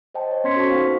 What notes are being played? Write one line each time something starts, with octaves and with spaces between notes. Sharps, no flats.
C5 D#5 G5 A5
C#5
B3 C#4 C6 G#6 B6 C#7
F#4 A4 C5 A5 C#6
A#3 D#4 F5 G5
B4